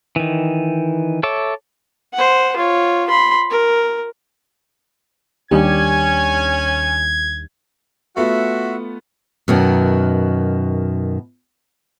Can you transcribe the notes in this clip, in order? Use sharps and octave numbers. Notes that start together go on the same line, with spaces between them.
D#3 E3
A4 C#5 E5 D6
C5 F#5
F4 C#5
B5 C6
A#4
D#2 G3 C#4 D4 G4 G#5 G#6
A3 B3 F4 F#4 E5
F#2 B2 D#3